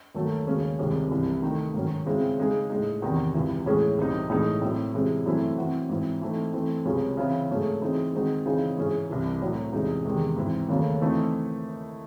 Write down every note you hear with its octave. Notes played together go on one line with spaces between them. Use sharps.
D#2 D#3 F#3 A3
D#2 C#3 G#3 C#4
C2 C3 D#3 G#3 C#4
C2 C3 E3
D#3 A3 D#4
G#2 D#3 F#3 C#4
C#3 G#3 C4 E4 C5
C#3 G#3 D#4 G#4
A2 G#3 D#4
E2 C3 D#3
C#2 C3 E3
A2 E3 G#3 C#4 G#4
C2 C3 E3 C4 D#4
A2 E3 G#3 D#4
A2 F#3 C4
C3 E3 G#3 C#4
F#2 E3 A3 C4 E4
E3 C4 F#4
G#2 E3 C4
E3 A3 C4 D#4
E3 A3 C4
C#2 C3 F#3 C#4 G#4
C#3 E3 C4 E4
G#2 F#3 A3 C#4 G#4
E3 C4 D#4 G#4 C5
D#3 G#3 C4 D#4 F#4
C#3 E3 C4 D#4 G#4
G#2 E3 G#3 C#4 G#4
C2 C3 E3
A2 F#3 C4
E2 C3 E3 G#3 D#4
E2 C3 D#3 G#3 C4
G#2 E3 C4 E4
D#2 C#3 F#3 A3
E3 A3 C4 D#4 A4